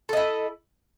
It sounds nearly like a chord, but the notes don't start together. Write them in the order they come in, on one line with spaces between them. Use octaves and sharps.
A4 D#5 E4